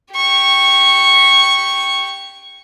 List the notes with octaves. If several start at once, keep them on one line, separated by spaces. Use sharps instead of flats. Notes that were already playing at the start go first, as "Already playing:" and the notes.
G4 C#6